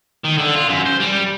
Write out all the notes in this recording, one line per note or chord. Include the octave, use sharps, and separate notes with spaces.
D#3
D3
F4
F#2
C5
G3